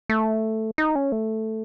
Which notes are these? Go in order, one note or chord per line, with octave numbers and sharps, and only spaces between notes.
A3
D#4
C#4
A3